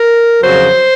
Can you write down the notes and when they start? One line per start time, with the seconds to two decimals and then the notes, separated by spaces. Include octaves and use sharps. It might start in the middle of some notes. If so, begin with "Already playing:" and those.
Already playing: A#4
0.42 F2 C#3 F#3 C5